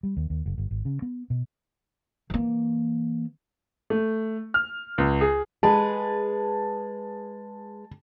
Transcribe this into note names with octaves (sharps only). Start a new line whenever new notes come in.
G3
D#2
D#2
F#1
G1
G#1
C#3
B3
B2
E3 A#3
A3
F6
C#2
G#4
G#3 G#4 B4 A5